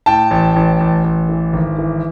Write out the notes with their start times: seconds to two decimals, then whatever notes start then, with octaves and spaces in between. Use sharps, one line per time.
0.06 A2 G5 A5
0.31 A1
0.56 A1
0.80 A1
1.04 A1
1.29 E3
1.53 G#1
1.78 E3